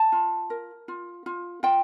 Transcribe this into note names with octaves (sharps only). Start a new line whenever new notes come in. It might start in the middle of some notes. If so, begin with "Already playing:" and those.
Already playing: A5
F4
A#4
F4
F4
F4 G5